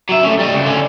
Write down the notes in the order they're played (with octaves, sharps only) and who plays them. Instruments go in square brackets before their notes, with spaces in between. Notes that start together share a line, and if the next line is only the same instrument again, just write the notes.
[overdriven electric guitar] F#3 E5
A3 C#4
G3 D#5
C#2
D3 C#4